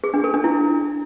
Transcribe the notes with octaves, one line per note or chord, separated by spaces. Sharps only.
G#4
D4
A4
D4
E4